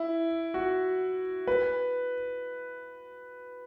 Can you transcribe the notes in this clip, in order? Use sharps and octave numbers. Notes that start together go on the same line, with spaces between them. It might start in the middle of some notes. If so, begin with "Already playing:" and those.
Already playing: E4
F#4
B4